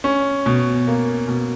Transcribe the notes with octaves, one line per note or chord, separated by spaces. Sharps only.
C#4
B2
A#3
B2